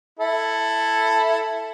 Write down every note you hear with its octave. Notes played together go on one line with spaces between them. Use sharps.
E4 A4